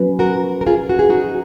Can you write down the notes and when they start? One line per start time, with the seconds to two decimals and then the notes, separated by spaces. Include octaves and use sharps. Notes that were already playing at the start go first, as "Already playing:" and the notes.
Already playing: F#3 C#4 B4
0.19 F#4 A#4
0.61 A#4
0.66 F4 G#4
0.89 F#4
0.99 G#4
1.10 D#4 F#4